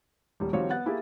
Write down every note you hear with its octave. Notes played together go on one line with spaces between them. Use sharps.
D#1 G3
D#3 F3 G3 C4 F#4 C#5
B3 F#5 F#6 A6
A#3 E4 G4 G#4